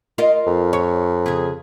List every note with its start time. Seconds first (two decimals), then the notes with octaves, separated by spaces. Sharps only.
0.18 F4 A#4 D#5
0.47 F2
0.73 C#5
1.26 C#3 G#4